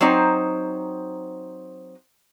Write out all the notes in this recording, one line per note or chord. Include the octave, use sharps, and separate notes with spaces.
F#3 C4 D#4 C5